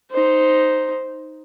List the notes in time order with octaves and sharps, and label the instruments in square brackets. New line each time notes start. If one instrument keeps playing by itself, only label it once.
[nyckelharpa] D#4 C5